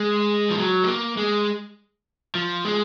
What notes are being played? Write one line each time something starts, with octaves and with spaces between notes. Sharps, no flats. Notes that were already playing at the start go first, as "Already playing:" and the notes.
Already playing: G#3
F3
F#3
G#3
A#3
G#3
F3
G#3